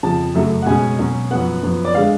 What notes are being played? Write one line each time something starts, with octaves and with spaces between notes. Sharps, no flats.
F2 C#3 F3 A5
F#2 C#3 F#3 A3
F#5
B2 G#3 C#4 G#5
B2 F#3 C#4
F#2 F3 B3 F#5
F#2 F3 B3
D5
D3 G#3 F5